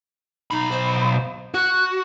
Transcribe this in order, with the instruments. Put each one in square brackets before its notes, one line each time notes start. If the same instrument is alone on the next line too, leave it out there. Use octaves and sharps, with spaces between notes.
[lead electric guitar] B1 B5 [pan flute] D#4
[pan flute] C5
[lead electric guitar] F#4 [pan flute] F#6